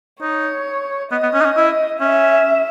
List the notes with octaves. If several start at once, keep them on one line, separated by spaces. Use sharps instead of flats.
D#4 C#5
B3 D#5
B3
C#4
D#4
C#4
E4
C#4 E5